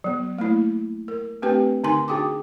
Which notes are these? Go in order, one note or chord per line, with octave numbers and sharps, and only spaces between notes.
F#3 B3
A3 A#3 E4
A#4
A3 C4 D4 G4 B4 G5
D3 D#4 G#5 C6
D4 F#4 G#4 G5 D6